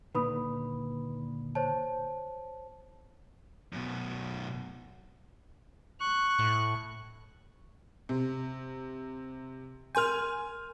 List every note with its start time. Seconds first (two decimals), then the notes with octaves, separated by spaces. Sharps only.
0.15 D2 A#2 D#3 B4 B5 D#6
1.55 C5 C#5 A5
3.73 F#2 B2
6.01 C#6 F#6
6.39 A2
8.09 C3
9.95 A#4 G#5 C6 F6 G6